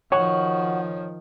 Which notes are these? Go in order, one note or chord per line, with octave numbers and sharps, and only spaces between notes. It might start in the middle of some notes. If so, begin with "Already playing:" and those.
D#3 F3 F#4 C#5